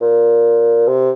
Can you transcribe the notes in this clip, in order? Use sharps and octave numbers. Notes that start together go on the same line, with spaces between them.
A#2
C3